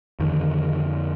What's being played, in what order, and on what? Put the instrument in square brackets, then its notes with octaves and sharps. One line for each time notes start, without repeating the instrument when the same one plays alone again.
[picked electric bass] F2 D3 D#3